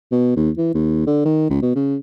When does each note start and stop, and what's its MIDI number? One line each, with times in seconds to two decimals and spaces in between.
0.12 0.33 47
0.36 0.50 39
0.57 0.71 52
0.74 1.03 39
1.07 1.23 50
1.25 1.47 51
1.50 1.62 37
1.62 1.73 47
1.75 1.96 49